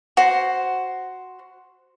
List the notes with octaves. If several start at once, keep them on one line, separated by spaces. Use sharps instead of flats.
F#4 C5